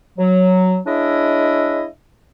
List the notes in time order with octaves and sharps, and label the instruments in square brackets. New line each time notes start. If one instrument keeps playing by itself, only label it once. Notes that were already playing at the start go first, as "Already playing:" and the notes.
[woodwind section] F#3
G#3 C#4 D4 E4 D#5 E5